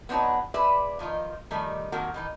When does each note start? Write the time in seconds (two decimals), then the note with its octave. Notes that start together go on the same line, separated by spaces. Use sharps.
0.09 B3 C4 D4 D#4 F#4 C#5
0.54 G#4 B4 C5 D5 E5
0.99 D#3 F3 D#4 F4
1.51 D#3 F3 G3 A3 D#4
1.92 C3 D#3 F#3 A#3 F#4 A#4
2.14 D#3 E3 D#4